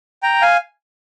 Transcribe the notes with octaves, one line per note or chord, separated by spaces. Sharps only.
G5 A#5
F5 G#5